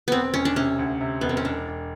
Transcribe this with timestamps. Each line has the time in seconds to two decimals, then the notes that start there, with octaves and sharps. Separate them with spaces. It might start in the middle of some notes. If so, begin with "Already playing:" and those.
0.08 E1 B3 C4
0.34 E1 C#4
0.45 D4
0.56 C3 C#4
0.79 D2
1.01 C3
1.21 E1 B3
1.29 C4
1.37 C#4
1.45 E1 D4
1.68 E1